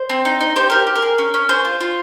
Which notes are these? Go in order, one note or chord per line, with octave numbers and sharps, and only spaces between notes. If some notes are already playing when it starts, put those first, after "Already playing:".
Already playing: C5
C4
D#4
D#4
G4 C5
G4 A#4
G4
A#4
G#4
C#4
C#4
G#4 C5
F4
F4